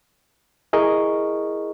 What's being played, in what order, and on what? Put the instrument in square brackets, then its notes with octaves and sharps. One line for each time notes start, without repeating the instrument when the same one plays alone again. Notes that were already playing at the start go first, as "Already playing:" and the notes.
[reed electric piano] E4 G#4 A#4 D#5 C#6